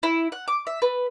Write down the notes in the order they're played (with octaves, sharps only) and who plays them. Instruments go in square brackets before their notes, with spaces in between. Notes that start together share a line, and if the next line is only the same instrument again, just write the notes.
[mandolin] E4
F#5
D6
E5
B4